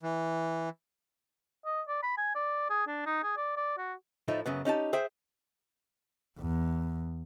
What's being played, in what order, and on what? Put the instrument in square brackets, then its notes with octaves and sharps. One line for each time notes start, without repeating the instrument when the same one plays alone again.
[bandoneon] E3
[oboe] D#5
D5
B5
G#5
D5
G#4
D4
D#4
G#4
D5
D5
F#4
[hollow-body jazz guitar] A2 F3 A3 D#4
F#2 C#3 B3
C#4 D#4 G4 A5
G#4 C5 E5 G5
[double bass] E2